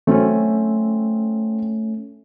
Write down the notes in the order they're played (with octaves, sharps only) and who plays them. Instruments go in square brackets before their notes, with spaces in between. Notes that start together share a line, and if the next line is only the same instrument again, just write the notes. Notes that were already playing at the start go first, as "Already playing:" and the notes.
[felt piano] F#3 C4 [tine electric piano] A3 C#4